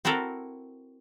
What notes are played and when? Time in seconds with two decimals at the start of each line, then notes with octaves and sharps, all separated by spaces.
0.05 C4 E4 F#4 A4 A#4